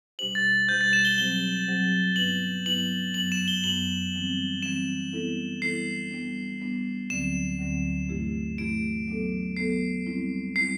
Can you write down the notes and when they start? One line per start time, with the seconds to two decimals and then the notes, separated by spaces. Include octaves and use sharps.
0.19 B2 G3 D4 G4 C5 F#7
0.35 A6
0.68 B2 G3 D4 G4 C5 G6
0.81 A6
0.93 E7
1.05 G7
1.18 F#3 C4 G4 C5 G7
1.67 F#3 C4 G4 C5
2.16 G2 F#3 B3 E4 B4 F#7
2.66 G2 F#3 B3 E4 B4 F#7
3.14 F#2 F#3 B3 F#7
3.32 E7
3.48 G7
3.64 F#2 F#3 B3 F#7
4.14 E3 G3 C4
4.62 E3 G3 C4 E7
5.13 E3 G3 B3 E4 A4
5.62 E3 G3 B3 E4 A4 C7
6.11 G3 B3 D4
6.61 G3 B3 D4
7.10 D2 D3 F#3 C4 E7
7.59 D2 D3 F#3 C4
8.09 G2 E3 A3 E4 G4
8.58 G2 E3 A3 E4 G4 D7
9.08 F#3 B3 D4 A4
9.57 F#3 B3 D4 A4 C7
10.06 G3 C4 E4
10.56 G3 C4 E4 C7